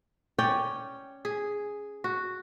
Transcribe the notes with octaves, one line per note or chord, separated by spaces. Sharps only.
C#4 C#5 D5 G5
G#4
F#4